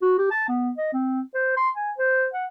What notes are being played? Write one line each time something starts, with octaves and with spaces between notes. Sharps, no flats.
F#4
G4
A5
B3
D#5
C4
C5
C6
G#5
C5
F#5